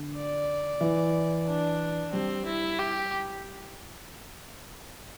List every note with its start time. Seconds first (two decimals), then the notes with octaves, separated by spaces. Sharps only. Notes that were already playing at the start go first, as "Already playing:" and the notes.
Already playing: D3
0.15 D5
0.81 E3
1.47 D4
2.13 G3 C4
2.46 E4
2.79 G4